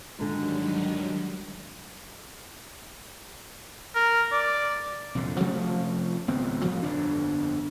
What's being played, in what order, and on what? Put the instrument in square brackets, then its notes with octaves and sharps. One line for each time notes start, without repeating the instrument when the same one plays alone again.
[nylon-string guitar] G#2 D3 [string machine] D#3 F#3 G3
[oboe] A#4
D5
[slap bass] C2 F2 A#2 D3
C3 F3 A3 C#4
G#1 C#2 B3 C4
A2 F3 G3
G1 F2 D4